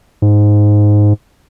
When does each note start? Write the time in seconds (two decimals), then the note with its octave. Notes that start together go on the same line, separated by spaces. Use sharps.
0.22 G#2